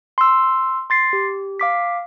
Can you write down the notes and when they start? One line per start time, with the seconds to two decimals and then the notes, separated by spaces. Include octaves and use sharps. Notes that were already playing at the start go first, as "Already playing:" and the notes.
0.18 C6 E6
0.90 C6 A6 C7
1.13 G4
1.60 F5 D6 B6